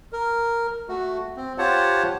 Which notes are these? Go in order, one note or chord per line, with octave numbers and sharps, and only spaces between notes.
A#4
A3 F#4
C4
F4 G4 C5 C#5 F#5 A5